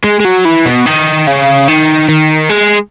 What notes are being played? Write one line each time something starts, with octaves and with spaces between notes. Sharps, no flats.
G#3
G#3
F#3
E3
B2
D#3
C#3
D#3
D#3
G#3